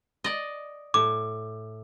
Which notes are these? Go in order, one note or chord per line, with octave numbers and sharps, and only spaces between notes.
D5 D#5
A2 D6